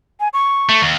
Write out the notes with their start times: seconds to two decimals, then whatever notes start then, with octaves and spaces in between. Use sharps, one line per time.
0.20 G#5
0.34 C#6
0.69 A3
0.82 D#2